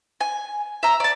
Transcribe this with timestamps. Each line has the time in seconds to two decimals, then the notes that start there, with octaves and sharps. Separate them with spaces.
0.21 G#5
0.83 E5 A#5
1.00 D5 A5